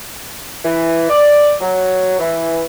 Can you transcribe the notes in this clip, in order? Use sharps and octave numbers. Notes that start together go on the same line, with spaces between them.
E3
D5
F#3
E3